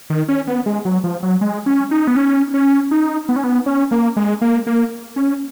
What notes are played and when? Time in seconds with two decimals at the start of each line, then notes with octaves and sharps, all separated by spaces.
0.10 D#3
0.28 C#4
0.47 B3
0.66 G#3
0.85 F#3
1.04 F3
1.23 F#3
1.41 G#3
1.66 C#4
1.91 D#4
2.07 B3
2.16 C#4
2.54 C#4
2.91 D#4
3.29 B3
3.36 C#4
3.44 B3
3.66 C#4
3.91 A#3
4.16 G#3
4.41 A#3
4.67 A#3
5.16 C#4